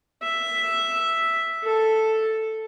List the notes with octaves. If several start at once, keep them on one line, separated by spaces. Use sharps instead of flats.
E5
A4